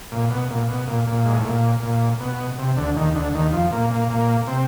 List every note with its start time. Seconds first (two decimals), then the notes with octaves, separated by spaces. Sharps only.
0.12 A#2
0.31 B2
0.50 A#2
0.68 B2
0.87 A#2
1.07 A#2
1.25 G#2
1.35 A2
1.45 A#2
1.83 A#2
2.20 B2
2.59 C3
2.77 D2 D3
2.96 D#2 D#3
3.15 D2 D3
3.34 D#2 D#3
3.53 F2 F3
3.72 A#2 A#3
3.91 A#2 A#3
4.10 A#2 A#3
4.47 C3 C4